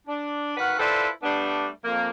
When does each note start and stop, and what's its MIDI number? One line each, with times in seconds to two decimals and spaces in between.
0.07 0.57 62
0.57 0.75 51
0.57 0.75 66
0.57 0.75 71
0.57 0.75 77
0.57 0.75 78
0.79 1.08 64
0.79 1.08 65
0.79 1.08 69
0.79 1.08 71
0.79 1.08 72
0.79 1.08 74
1.23 1.68 55
1.23 1.68 57
1.23 1.68 59
1.23 1.68 62
1.85 2.10 41
1.85 2.10 58